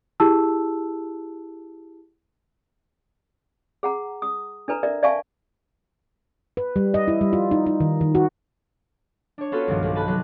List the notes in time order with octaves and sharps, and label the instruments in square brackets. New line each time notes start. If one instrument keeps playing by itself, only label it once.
[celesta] E4 G4 G#4 A5 E6
[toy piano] G#4 F#5 A#5
D#6
D4 A4 B4 A#5
A#4 D5 E5
D5 E5 F5 G#5 A5 C#6
[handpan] B4
G3
D#5
E4
G3
F4
D#4
D#4
D#3
D#3
F#4
[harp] D4 C#5
B3 C#4 F4 F#4 A4 B4
C2 G2 A#2 D#3 F3
B1
G#5 A5 B5 F#6
C3 F#3 F#6